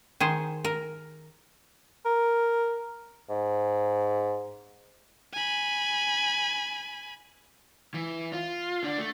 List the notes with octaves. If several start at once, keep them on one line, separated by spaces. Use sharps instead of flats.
D#3 G#4 C5
A#4
A#4
G#2
G#5 B5
E3
F4
D3 D4
A3